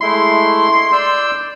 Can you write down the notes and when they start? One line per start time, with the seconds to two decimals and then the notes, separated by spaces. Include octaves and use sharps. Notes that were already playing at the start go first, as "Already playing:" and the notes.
0.01 G#3 A3 E4 C6
0.92 D5 E6 G6